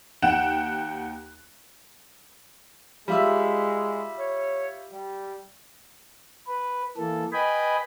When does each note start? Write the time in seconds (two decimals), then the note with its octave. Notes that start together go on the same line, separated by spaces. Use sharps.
0.22 D#2 F#5 G5 F#6 E7
3.08 G3 G#3 F4 E5
4.19 C#5
4.93 G3
6.47 B4
6.97 E3 A#3 A4
7.32 B4 D#5 G5 G#5 B5